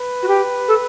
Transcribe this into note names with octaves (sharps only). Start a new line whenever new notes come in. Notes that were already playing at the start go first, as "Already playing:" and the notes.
Already playing: B4
F#4
G4
A4